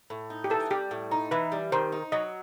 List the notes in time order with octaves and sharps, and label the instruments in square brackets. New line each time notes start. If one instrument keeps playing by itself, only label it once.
[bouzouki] A2
D#4
[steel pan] G4
[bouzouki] E3 [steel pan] A4
[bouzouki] G3 [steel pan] G4
[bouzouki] A2
D#4
[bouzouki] E3 [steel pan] B4
[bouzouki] G3
[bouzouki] D#3 [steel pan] C5
[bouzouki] D#4
[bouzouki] F#3 [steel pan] D#5